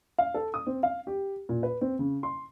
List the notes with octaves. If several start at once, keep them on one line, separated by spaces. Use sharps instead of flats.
F5
A4
D#6
C4
F5
G4
A#2
B4
C4
C#3
C6